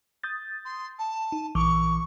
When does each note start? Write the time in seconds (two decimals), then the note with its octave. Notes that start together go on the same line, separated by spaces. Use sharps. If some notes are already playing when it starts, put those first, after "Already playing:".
0.24 D#6 G6 A6
0.65 C6
0.98 A5
1.32 D#4
1.55 A#1 E3 C#6 D6